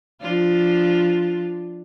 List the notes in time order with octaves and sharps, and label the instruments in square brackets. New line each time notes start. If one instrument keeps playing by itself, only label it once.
[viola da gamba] F3 D4 F4